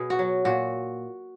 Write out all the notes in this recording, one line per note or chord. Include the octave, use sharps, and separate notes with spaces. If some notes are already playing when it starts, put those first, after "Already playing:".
Already playing: B2 G#4
F#4
F#3
A#2 F#4